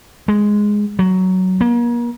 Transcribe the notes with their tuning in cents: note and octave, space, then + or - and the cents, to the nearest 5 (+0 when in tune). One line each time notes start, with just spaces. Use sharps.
G#3 +0
F#3 +10
A#3 +40